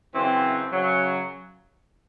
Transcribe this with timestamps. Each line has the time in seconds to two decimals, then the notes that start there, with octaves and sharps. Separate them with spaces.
0.14 F#2 C#3 E3 C4
0.72 F#2 C#3 F#3